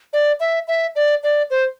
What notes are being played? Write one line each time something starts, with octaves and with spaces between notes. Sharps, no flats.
D5
E5
E5
D5
D5
C5